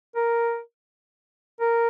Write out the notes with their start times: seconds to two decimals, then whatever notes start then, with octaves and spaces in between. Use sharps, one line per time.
0.16 A#4
1.61 A#4